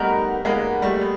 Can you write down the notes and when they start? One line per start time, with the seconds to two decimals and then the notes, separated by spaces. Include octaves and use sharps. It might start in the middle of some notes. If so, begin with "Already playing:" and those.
Already playing: G3 A3 B3 D#4 F#4 A#4
0.45 G#3 A#3 B3 D#4 F#4 A#4
0.82 G3 A3
1.01 B3